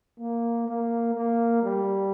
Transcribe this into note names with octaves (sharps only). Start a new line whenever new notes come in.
A#3
A#3
A#3
G3